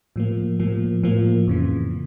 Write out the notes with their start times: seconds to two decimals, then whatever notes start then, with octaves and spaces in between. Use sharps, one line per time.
0.16 A2 F3 A#3
0.60 A2 F3 A#3
1.03 A2 F3 A#3
1.48 F2 C#3 E3